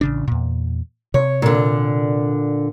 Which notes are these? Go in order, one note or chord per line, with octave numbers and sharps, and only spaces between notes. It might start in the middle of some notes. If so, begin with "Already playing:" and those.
A1 C#3 D4
E2 A#2
C3 C#5
A#2 D3